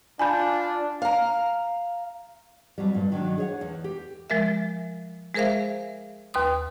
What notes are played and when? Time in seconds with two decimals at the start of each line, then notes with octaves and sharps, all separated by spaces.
0.19 D4 F4 G#5 B5 G6
1.02 F5 A#5
2.78 F2 F#3 G3
2.95 G2 A#2
3.12 D#3 F#3 D4
3.38 G#4 C#5 F#5
3.61 E2
3.84 G4
4.30 F3 G#3 A#4 E5
5.34 G#3 G#4 A#4 C5 E5 F5
6.34 D#2 B4 C6 D#6